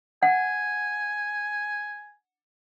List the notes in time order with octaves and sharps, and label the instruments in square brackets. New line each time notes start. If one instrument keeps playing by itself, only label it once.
[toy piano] F#5 [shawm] G#5